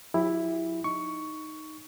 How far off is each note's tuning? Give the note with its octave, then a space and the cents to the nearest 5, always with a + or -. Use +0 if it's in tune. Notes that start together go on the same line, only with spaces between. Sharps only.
F#3 -40 E4 +0 G4 +30
D#4 +0 C#6 +10